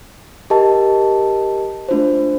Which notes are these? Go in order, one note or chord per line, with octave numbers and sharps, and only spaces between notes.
G4 A#4 D#5 A5
A3 D4 F4 C5